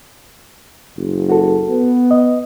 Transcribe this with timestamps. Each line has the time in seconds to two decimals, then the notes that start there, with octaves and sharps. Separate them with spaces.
0.97 F#1
1.30 F#4 A4
1.70 B3
2.11 D#5